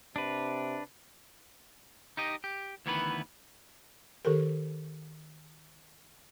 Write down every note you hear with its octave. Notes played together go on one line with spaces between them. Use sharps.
C3 D4 B4
D#4 G4 D#5
G4
D2 D#3 E3 B3 F#4 B4
D#3 G4 A4 A#4